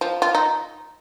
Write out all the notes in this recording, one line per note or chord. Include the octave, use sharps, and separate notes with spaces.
F3
F4
D#4